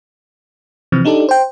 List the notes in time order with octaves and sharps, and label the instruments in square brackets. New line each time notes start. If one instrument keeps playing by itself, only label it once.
[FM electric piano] C3 E3 F3 C4
D4 D#4 G4 A4 D5
C5 G5